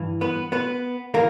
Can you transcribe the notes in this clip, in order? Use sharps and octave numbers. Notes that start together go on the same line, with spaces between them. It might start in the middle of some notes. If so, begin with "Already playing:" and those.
Already playing: G2 E3
B3 B4
B3 B4
E3 A#3 A#4